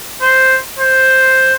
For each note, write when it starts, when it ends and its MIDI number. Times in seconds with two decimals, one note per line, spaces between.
0.22 0.58 72
0.79 1.54 72